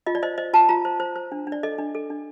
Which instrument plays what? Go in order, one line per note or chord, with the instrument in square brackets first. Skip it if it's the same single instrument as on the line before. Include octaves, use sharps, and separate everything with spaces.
[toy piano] F4 D#5
D5
C5 D#5
C5 D#5
F4 A5
F4 A#5
C5
C5
C5
D4
D4
D5
A4 D#5
D4
A4
D4